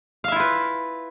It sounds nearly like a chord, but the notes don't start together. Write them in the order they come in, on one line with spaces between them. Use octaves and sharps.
F5 E5 E4 F4 B4